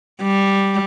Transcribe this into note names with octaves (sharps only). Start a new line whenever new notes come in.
G3